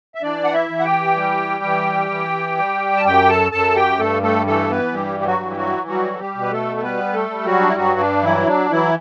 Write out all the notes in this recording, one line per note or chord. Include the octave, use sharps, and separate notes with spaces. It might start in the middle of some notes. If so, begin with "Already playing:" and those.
E5
E3 D4 D5
F#5
E4 E5
E3
F#5
G4 G5
G3
E3
E3
G3
A5
F#2 G4 G5
A4 A5
F#2 A4 A5
G4 G5
G2 A3 A4
A3 A4
E3 A3 A4
B3 B4
G2 G3 G4
G4
F#3 F#4
E3
G4
F#3 F#4
F#3 G3 F#4
A4
G3 G4
B2
B4
A3 A4
A4
G3 B3 B4
A3 A4
G3
F#3 F#4
D4
E4
G2 F#3 F#4
D4
E3 F#3 E4
D4
E3 F#3 E4